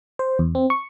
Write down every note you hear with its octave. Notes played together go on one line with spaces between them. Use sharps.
C5
E2
C4
C#6